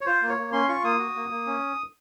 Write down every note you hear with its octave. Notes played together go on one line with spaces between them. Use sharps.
C#5
F4 C5
A#3
C#5
A#3
C#4 C6
F4 C#6
A#3 D#6
F#4
A#3
A#3
C#4